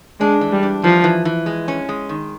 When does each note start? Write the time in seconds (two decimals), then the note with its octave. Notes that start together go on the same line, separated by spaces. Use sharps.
0.20 G#3 D4
0.41 E3
0.52 G3
0.63 D4
0.84 E3 F3
1.04 E3
1.25 E3
1.46 G#3
1.68 C#4
1.89 G#3
2.09 D#3